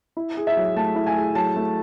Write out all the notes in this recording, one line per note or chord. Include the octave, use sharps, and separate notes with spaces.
E4
G#4
E5
F#3
A3 A5
E4
G#5
G#4
F#3 A5
A3